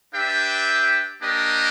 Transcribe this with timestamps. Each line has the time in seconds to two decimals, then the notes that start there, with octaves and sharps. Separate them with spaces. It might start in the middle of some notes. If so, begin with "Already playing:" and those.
0.14 D4 G4 B4 E5 G5
1.21 A#3 D4 G4 A#4 D#5